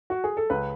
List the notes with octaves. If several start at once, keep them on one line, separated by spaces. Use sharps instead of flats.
F#4
G#4
A4
C#2 B4